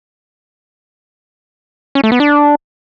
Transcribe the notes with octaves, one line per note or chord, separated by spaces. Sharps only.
C#4
A3
B3
D4